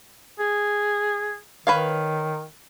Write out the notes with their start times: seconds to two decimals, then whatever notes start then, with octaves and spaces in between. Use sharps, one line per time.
0.40 G#4
1.67 D#3 B4 C#5 F5